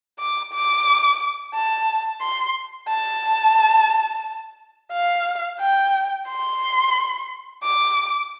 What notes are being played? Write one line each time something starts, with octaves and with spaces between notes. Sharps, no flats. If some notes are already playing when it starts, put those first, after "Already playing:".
D6
D6
A5
C6
A5
F5
G5
C6
D6